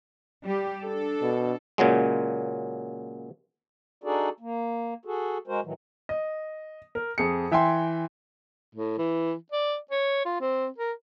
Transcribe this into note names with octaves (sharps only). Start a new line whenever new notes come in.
G3 G4
D4 A4
B2
A#2 C#3 F#3 G#3
D4 D#4 F#4 G#4 A4 D5
A#3
F#4 G#4 A4
G#3 F#4 A#4 C5
A2 D#3 E3 F#3
D#5
A#4
F2 G#4 C#7
E3 E5 G5 G#5 C6
A2
E3
D5
C#5
F4
C4
A#4